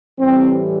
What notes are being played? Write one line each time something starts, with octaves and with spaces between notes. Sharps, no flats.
A2 E3 G3 C4